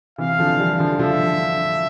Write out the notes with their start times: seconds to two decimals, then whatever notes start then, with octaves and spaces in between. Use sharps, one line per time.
0.18 C3 E3 F5
0.39 D3 F3
0.59 E3 G3
0.79 D3 F3
0.99 D3 F3 E5